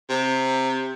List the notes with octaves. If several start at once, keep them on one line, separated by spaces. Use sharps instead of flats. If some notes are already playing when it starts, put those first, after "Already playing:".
C3